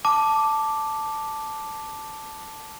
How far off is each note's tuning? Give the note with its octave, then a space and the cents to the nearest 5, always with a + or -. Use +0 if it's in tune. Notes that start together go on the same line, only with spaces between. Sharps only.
A5 +0 D6 +0